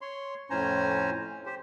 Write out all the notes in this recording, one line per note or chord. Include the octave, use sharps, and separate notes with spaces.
C#5 C6
F2 A2 C#4 C5 G#5 A#5
G4 C5